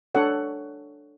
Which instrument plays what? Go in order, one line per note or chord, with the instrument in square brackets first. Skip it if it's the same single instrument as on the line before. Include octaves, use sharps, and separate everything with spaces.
[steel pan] D4 A4 C#5 F#5